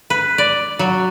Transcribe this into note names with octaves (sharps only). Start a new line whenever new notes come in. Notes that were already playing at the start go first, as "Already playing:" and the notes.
B4
D5
F#3